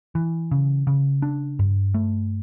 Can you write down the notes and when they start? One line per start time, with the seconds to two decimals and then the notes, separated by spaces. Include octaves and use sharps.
0.15 E3
0.51 C#3
0.87 C#3
1.22 D4
1.59 G2
1.94 A3